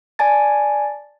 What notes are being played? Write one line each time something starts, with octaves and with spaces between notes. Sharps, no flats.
D5 G#5 A5 A6